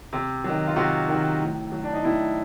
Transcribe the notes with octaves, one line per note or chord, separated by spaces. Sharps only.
C3
D#3 F#3
F4
C3 F#4
D#3 F#3
A2
F#3
D4
D#4
A2 E4